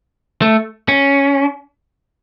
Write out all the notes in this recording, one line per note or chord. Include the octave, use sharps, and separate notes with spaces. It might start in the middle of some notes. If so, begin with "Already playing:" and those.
A3
C#4